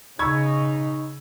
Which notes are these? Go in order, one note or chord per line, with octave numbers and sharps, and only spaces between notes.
C#3 D#4 B5 C#6 E6 G#6